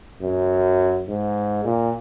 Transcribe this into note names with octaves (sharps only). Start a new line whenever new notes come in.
F#2
G#2
A#2